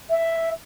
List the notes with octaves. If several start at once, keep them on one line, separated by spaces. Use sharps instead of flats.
E5